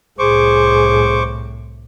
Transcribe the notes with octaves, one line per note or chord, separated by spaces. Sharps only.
C2 A2 G#4 C5 C#6 D6